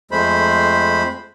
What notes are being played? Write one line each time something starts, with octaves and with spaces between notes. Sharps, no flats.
F2 G#3 A3 C5 B5